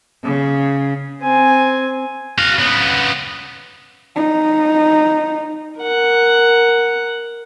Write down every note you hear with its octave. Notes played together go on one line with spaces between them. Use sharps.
C#3
C4 G#5
F#4 F5
C#3 B3
D#4
A#4 F#5